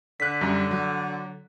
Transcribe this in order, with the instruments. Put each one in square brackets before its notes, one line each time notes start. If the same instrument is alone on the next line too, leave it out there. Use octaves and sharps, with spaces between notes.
[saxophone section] D3 [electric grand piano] F#6 B6
[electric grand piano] F#2 G3
F#3